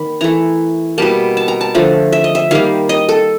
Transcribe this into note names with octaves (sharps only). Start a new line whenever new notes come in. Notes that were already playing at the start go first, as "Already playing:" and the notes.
Already playing: D#3 A#3 B5
E3 A3 A#5
B2 G3 A#3 A5
A5
A#5
A5
D3 F3 A3
E5
D#5
E5
D#3 G3 A#3 F5
D#5
A4